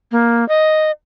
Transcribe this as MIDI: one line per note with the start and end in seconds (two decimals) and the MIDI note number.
0.12 0.47 58
0.49 0.91 75